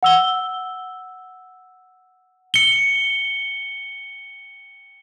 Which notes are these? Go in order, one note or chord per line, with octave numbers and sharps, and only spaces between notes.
F#5 E6 G7
C#7 G7